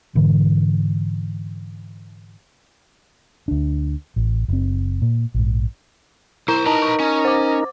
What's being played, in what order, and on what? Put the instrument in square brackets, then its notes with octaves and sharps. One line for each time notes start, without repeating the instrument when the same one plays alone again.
[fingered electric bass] G#2 D3 E3
D2 D4
A1
F#1 C4
A#2
A#1 G#2
[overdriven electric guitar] B1 C5 [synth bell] E4 A#5
[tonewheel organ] D#4 A#4 [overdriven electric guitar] B4 A#5 [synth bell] A5
[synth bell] C#6
[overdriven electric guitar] C#4
[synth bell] C5 D6